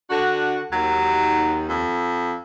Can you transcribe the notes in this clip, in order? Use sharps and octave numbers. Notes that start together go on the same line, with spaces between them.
D3 D4 F#4
D#2 F#3
F2